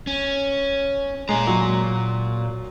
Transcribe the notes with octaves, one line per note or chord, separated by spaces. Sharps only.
C#4
A#2 G#3 A#5
F#3